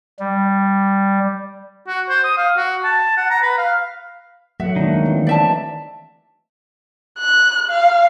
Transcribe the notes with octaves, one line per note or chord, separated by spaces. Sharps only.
G3
F#4
C5
D#6
F5
F#4
A5
F#5
A#5
B4
F5
F#3 A3 E5 F#5
D#3 G#3 A#3 D4
E3 C4
D5 E5 A5
F#6
F5